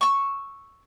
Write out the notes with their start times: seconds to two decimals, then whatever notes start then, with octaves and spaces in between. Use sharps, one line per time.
0.01 C#6 E6